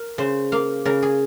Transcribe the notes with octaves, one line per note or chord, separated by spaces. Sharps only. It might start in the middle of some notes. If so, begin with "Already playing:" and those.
Already playing: A#4
C#3 C5
A#3 F5
C#3 A#4
G#4